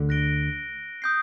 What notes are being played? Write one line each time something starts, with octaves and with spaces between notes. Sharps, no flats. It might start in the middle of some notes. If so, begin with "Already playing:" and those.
Already playing: D2 D3
F#6 A#6 D7 G7
D#6 G6 C7